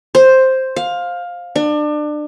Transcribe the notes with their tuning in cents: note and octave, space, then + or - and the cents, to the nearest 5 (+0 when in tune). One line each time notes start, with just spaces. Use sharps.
C5 +5
F5 +15
D4 +30